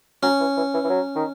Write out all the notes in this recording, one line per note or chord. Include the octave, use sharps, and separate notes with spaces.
F#3 C#4
E3
E3
E3
E3
F#3
D#3